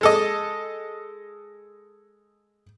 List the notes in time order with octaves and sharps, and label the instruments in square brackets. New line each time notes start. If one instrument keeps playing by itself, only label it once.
[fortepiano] G#3 A4 D#5